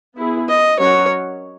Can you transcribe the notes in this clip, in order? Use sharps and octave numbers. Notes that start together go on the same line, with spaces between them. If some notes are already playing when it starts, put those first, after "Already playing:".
B3 E4 G#4
D#5
F#3 C#4 F#4 A#4 C#5